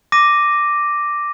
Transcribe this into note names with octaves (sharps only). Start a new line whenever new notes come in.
D6 A#6 D#7